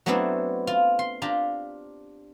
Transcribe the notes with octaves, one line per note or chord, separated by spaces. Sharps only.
F#3 A3 B3 C4 D4 E4
F4
C6
D4 F4 G4 A#5